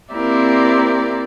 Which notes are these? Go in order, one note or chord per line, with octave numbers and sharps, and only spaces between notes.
A#3 C4 E4 G4 A#4 D5